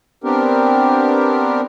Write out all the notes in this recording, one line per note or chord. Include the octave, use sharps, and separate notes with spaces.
B3 C4 D4 G4 A#4